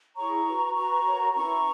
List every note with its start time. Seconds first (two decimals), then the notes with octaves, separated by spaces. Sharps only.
0.17 E4 G#4 C#5 A#5 C#6
0.47 F#4 B4
0.76 F#4 B4 A#5 C#6
1.05 F#4 A#4 C#5
1.34 C#4 E4 B4 A#5 C#6